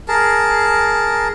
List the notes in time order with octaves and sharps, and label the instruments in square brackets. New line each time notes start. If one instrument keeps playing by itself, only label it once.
[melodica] G#4 A#4 A5